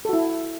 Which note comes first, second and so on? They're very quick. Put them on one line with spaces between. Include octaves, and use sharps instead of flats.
A4 F#4 E4